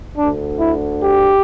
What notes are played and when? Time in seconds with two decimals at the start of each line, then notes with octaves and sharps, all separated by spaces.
0.16 D2 D3 D4
0.59 E4
1.03 G4